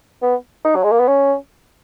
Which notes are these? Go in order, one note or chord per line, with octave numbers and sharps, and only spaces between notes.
B3
D#4
F#3
G#3
A#3
B3
C#4